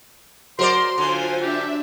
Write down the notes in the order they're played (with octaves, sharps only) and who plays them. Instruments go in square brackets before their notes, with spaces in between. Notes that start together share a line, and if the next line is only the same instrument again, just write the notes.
[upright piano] F#3 [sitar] A#4 C5 D5 [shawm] C6
[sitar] D3 [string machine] F4 C5 G#5
[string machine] D4 E5 [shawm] G4